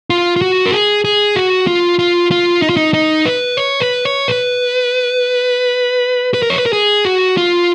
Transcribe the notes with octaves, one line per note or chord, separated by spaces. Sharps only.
F4
F4
F#4
A#4
G#4
G#4
F#4
F4
F4
F4
D#4
F4
D#4
D#4
B4
C#5
B4
C#5
B4
B4
A#4
C#5
B4
A#4
G#4
F#4
F4